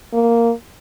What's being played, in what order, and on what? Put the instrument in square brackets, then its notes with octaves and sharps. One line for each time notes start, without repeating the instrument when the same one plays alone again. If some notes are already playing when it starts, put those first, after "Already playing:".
[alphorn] A#3